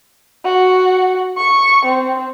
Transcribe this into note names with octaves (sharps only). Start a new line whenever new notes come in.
F#4
C#6
C4